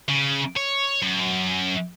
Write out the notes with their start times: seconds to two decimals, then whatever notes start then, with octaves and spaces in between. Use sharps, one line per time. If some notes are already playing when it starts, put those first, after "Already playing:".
0.09 C#3
0.56 C#5
1.03 F#2